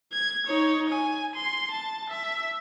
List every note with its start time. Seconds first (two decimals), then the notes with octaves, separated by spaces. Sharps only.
0.12 G#6
0.47 D#4 C#5
0.89 G#5
1.35 C6
1.71 A5
2.10 E5